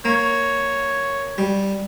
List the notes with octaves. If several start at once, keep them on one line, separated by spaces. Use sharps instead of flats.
A#3 C#5
G3